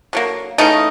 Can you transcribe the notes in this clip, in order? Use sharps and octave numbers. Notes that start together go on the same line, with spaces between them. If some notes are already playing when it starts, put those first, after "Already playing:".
D3 F#3 A#3
C#3 E3 A3 D#4